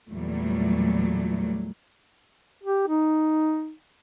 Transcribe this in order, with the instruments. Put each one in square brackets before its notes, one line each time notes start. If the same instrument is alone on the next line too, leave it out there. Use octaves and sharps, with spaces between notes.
[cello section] E2 A#2 F#3 G3 A3
[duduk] G4
D#4